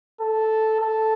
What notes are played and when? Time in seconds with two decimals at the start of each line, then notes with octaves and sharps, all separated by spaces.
0.21 A4
0.80 A4